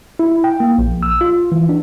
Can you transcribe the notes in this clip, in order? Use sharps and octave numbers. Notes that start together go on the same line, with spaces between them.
E4
G5
A#3
A#1
E6
F4
E3
D4